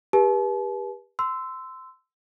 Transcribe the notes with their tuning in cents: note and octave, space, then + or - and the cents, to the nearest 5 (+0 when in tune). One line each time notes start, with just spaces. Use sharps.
G4 +20 B4 -40 A5 -40
C6 -20 E6 +0